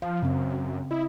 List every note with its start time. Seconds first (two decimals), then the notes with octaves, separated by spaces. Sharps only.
0.02 F3 F5
0.23 F#2 C#3 C4
0.91 E4 D#5